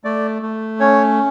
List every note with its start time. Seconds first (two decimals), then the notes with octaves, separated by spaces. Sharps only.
0.04 A3 D5
0.42 A3
0.80 C#4 C#5